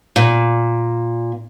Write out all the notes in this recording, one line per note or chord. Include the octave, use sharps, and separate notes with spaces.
A#2